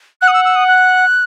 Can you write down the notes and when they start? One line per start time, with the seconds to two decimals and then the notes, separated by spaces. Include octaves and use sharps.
0.22 F#5 F#6
0.28 D#6
0.33 E6
0.45 E6
0.56 D#6
0.68 F#6